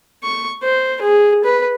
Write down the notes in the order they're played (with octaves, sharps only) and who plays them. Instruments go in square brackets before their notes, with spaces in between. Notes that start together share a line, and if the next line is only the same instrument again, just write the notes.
[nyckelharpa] C#6
C5
G#4
B4